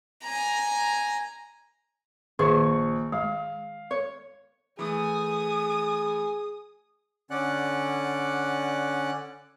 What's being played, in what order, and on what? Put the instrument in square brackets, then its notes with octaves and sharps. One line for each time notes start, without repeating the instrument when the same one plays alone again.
[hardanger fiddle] G#5 A#5
[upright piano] A#1 C#6 [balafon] D#3 [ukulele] G#4
[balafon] G#3 [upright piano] F5
[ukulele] C#5
[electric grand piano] E3 A3 [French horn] G#4 [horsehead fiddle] G#5 [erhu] D#6
[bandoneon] D3 C#4 D5 F#5 F#6